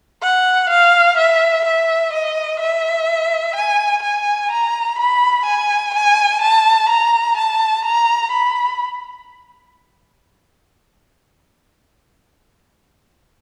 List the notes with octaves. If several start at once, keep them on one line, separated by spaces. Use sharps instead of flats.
F#5
F5
E5
E5
D#5
E5
G#5
G#5
A#5
B5
G#5
G#5
A5
A#5
A5
A#5
B5